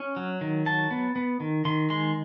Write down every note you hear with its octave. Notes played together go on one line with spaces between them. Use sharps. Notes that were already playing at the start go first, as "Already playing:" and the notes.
Already playing: C#4
F#3
D#3
F#3 A5
B3
B3
D#3
D#3 C6
G#3 C6